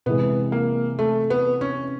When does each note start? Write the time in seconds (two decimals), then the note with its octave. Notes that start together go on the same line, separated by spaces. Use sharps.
0.06 C3 E3 G#3 B3
0.52 A#3
0.99 A3
1.30 B3
1.61 C#4